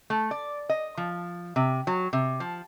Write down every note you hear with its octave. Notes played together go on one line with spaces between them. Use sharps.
A3
D5
D#5
F3
C3
F#3
C3
F3